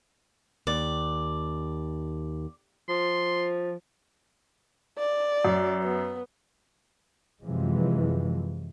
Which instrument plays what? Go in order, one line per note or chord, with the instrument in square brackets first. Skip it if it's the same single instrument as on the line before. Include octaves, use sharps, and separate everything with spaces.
[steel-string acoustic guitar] D#2 [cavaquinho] D5
[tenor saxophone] F3 [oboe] C6
[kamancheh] D5
[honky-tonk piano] F#2
[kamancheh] B3
[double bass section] F#2 C3 E3 F3 G#3